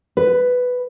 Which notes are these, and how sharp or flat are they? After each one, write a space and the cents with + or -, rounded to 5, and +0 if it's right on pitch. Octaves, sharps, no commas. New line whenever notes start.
B4 +5